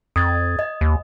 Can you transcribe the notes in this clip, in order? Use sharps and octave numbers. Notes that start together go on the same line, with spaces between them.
F2 D#6 G#6 A6
D#5
D#2